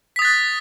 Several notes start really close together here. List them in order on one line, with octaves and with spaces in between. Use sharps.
B6 D#6 A6 F#6